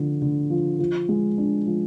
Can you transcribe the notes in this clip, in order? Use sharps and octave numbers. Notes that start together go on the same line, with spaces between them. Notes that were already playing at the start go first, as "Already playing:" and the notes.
Already playing: D3 F3
D3
F3
F3
G#3
D4
F3